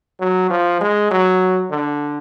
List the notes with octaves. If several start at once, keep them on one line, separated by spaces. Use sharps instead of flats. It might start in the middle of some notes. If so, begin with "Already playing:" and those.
F#3
F3
G#3
F#3
D3